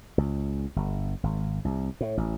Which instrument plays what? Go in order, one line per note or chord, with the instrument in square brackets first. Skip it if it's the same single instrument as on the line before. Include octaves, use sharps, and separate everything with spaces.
[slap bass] C#2
G1
G#1
C2
A2
A1